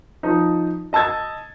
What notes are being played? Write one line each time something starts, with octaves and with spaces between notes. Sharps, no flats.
F3 D#4
D#5 A5 E6 G#6 A6